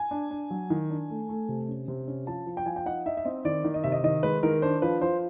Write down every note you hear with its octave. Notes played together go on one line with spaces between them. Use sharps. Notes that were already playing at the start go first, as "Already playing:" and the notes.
Already playing: G#5
D4
D4
F#3
D#3
D4
A3
A3
C3
C#4
C3
C#4
F3 A5
F3
G5
F3 G#5
G5
D#4 F#5
D#4 E5
E5
C4 D#5
D#3 D5
D#3
D#5
C3 E5
D#5
D#3 D#5
G#3 B4
D#3 A#4
D4 C5
F3 B4
F3 C5